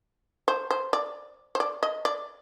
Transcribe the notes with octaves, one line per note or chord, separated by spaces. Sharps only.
C5
C5
D5
C5
D5
D#5
D5